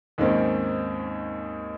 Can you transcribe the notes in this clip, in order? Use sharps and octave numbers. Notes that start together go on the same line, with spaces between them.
D#2 G#2 D#3 A#3 C4 C#4